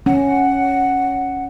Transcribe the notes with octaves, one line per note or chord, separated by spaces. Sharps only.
C#4 F#5